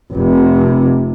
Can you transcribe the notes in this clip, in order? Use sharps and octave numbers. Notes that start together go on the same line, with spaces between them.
F1 C3